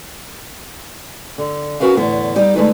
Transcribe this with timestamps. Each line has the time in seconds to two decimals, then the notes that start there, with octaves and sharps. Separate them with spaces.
1.38 D3
1.80 C#4 D4 F#4 A#4 B4 F5
1.97 E2 A2 D3 B3
2.36 G3 D#4 G4 D5
2.56 D3 G#3 A3 D#4 F4 B4